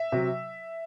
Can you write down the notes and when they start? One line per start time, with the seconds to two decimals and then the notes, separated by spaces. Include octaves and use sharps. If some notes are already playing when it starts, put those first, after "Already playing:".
Already playing: E5
0.12 C3 F#3